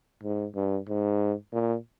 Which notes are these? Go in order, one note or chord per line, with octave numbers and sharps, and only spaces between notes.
G#2
G2
G#2
A#2